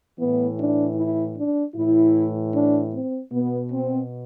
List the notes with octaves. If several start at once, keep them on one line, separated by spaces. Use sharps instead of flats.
A2 E3 B3
D4
E4
D4
A2 E3 E4
D4
C4
B2 B3
C4